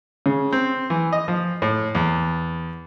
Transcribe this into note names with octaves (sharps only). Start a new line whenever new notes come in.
C#3
C4
E3
D#5
F3
A2
E2